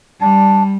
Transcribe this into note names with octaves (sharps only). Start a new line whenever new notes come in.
G3 D4